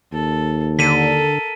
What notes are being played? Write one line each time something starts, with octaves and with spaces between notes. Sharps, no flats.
D#2 A4
D3 A4 A#4 B6 D#7